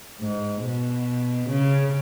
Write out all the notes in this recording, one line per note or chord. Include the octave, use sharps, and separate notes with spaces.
G#2
B2
C#3